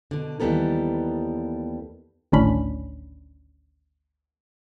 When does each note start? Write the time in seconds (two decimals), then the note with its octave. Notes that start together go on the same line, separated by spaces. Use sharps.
0.11 B2 D3
0.40 D#2 E3 G3 B3 A4 A#4
2.32 G#1 D2 A2 C#4 D4 B5